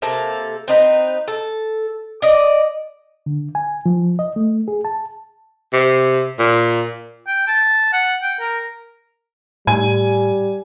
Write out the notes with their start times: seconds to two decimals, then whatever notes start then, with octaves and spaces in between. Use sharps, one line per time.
0.02 C3 A#3 A4
0.68 C4 D#4 B4
1.28 A4
2.22 D5 D#5
3.26 D3
3.55 G#5
3.86 F3
4.19 D#5
4.36 A3
4.68 G#4
4.85 A5
5.73 C3
6.39 A#2
7.27 G5
7.48 A5
7.93 F#5
8.23 G5
8.40 A#4
9.67 A2 G3 G#5